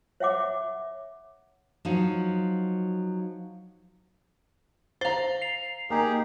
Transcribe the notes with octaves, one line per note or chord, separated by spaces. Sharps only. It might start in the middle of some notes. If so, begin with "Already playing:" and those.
C#5 E5 F#5 D6
F3 F#3 D#4
C5 F5 A#5 A6
C7 F7
A#3 D#4 G4 G#4